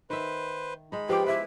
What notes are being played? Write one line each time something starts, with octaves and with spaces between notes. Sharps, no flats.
D#3 B4 C5 E5
G#3 D#4 B5
F3 B3 F4 G4 G5 D6
E4 B4 E5